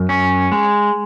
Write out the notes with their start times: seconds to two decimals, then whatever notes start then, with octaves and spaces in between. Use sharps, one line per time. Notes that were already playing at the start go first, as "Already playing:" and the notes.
Already playing: F#2
0.09 C#4
0.52 G#3